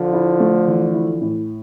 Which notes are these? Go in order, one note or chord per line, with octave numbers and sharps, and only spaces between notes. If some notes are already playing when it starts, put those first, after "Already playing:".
Already playing: D3 F3
E4
A3
E3
E4
A2